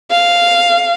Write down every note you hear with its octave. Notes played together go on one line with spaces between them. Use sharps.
F5